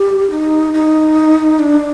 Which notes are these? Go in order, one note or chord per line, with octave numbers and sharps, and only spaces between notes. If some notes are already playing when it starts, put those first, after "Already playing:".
Already playing: G4
D#4
D#4
D4